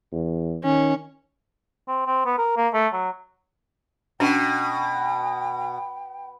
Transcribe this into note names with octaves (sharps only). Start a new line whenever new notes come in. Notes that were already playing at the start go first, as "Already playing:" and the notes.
E2
D#3 C#4
C4
C4
B3
A#4
A#3
A3
F#3
B2 C#4 D4 G5